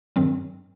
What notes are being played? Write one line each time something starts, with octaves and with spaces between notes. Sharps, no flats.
G2 D#3 F#3 C4